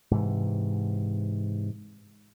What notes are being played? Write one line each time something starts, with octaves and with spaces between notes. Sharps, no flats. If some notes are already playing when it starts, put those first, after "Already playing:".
G#2 C3 E3